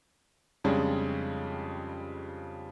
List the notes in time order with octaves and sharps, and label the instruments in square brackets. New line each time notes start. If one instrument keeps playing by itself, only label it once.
[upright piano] F2 C#3 G3 G#3 C#4 D4